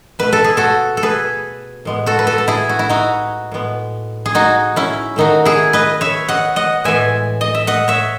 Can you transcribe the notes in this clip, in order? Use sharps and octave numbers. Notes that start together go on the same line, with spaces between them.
B2 A3 B4
A4
G#4
F#4 A4
A4
G#4 B4
A2 G#3 B3
F#4 A4
B4
F#4 A4
A4
E4 G#4
F#4
E4
D#4 F#4
A2 G#3 B3
G#4
D#4 F#4
C#4 E4
D#3 A3 D#4 F#4
E4 G#4
B4 D#5
C#5 E5
D#5 F#5
D#5 F#5
A2 E3 G#3 B3 E5 G#5
D#5
E5
D#5 F#5
C#5 E5